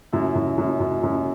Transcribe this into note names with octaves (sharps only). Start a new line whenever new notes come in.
F#2 E4
F#2
F#2
F#2
F#2